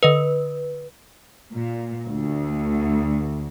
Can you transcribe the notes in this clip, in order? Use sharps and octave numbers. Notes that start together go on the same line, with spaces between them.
D3 B4 D#5 D#6
A#2
D2